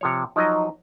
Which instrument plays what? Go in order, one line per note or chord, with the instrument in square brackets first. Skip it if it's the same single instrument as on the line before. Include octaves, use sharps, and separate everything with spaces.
[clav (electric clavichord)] C3 F3 C#5
[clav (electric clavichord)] F3 F#3 D#5 [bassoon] D#4